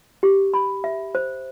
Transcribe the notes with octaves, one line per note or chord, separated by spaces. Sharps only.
G4
B5
E5
C5